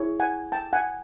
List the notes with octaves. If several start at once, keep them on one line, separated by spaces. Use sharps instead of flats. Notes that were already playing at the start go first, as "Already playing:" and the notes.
Already playing: E4 G#4 C#5
F#5 G#5
G5 A5
F#5 G#5